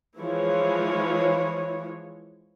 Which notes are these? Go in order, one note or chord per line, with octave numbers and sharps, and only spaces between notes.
E3 F3 G#3 E4 C#5